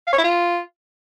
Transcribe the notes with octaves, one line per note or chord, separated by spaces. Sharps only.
F5
C#5
E4
F4